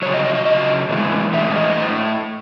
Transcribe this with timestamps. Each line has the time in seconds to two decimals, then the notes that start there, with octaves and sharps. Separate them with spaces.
0.02 C#3 F#3 C#5
0.14 D#5
0.25 D#5
0.35 D#5
0.45 C#3 F#3 D#5
0.89 A2 E3 G#3
1.33 A2 E3 G#3 E5
1.56 D#5
1.77 A2